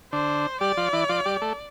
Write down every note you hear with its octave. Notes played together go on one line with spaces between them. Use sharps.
D3 D4 C5
G3 G4 D5
F3 F4
E3 E4
F3 F4
G3 G4
A3 A4